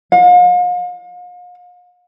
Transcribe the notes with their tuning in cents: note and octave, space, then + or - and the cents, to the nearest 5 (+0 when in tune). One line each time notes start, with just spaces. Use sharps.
F5 +45